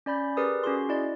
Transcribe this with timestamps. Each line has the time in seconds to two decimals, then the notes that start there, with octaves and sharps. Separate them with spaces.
0.06 C#4 D5 B5 G6
0.37 G4 G#4 A#4 B4 D5 D#6
0.64 C#4 F#4 G#4 C6
0.89 E4 D5 D#5